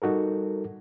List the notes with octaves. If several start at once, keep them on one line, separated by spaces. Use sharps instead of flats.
G3 D#4 F#4 A4 A#4